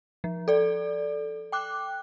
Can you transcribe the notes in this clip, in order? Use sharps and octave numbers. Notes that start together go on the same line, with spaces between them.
F3
A4 D5
G5 D6 F#6